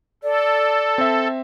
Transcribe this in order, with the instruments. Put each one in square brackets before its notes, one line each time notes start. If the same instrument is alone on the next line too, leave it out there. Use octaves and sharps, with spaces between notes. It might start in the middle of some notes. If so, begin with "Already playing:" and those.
[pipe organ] A4 [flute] D5
[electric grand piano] C4 E5